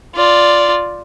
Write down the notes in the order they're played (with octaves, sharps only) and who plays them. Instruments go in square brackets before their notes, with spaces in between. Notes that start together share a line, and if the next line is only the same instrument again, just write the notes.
[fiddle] F4 D5